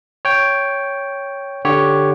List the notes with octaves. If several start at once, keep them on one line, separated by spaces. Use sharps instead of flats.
C#5 G5
D3 G4 C#5